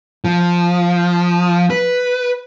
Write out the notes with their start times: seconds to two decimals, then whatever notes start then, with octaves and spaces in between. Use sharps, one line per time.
0.25 F3
1.70 B4